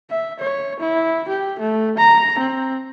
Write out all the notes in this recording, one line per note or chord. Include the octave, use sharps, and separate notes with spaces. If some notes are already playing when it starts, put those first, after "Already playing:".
E5
C#5
E4
G4
A3
A#5
C4